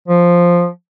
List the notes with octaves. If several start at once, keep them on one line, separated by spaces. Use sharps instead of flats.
F3